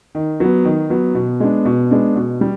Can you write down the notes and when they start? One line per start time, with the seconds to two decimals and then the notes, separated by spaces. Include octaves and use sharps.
0.15 D#3
0.40 F#3 B3
0.65 D#3
0.90 F#3 B3
1.15 B2
1.40 G#3 B3 D4
1.65 B2
1.91 G#3 B3 D4
2.15 B2
2.41 G3